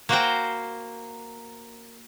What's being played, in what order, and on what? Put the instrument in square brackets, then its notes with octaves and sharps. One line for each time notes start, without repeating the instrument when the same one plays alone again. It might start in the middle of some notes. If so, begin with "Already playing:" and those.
[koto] A#3 F#4 A#4 C5 F#5 G5